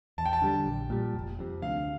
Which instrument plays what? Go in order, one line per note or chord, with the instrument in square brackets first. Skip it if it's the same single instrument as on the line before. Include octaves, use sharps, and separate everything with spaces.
[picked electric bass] E2 [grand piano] A5
[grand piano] G5
A5
[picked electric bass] D3 G3
A#1
A#2 G3
F1
F2 C3
[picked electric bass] D2 [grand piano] F5